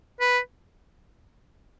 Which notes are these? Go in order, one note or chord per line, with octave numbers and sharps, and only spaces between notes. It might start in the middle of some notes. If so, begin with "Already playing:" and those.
B4